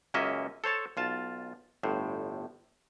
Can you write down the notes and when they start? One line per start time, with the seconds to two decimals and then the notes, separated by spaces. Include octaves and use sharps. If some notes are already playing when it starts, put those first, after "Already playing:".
0.14 C#2 F#2 A#3 C#4 D#5 E5
0.64 A4 C5 C#5 A5
0.97 B1 F4 A5
1.83 G1 A2 C5